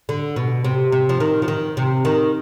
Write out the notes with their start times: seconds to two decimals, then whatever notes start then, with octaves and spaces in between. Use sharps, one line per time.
0.09 D3
0.36 B2
0.65 C3
0.92 C3
1.09 F3
1.20 D#3
1.42 F3
1.48 D#3
1.77 C3
2.05 D#3